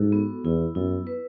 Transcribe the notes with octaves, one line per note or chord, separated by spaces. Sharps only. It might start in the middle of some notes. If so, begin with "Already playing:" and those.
Already playing: G#2 E4 F#4 A4
B3
E2 E4
F#2 E4
B4